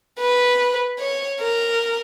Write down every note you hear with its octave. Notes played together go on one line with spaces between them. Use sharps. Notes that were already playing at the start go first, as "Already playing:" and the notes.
B4
C#5
A#4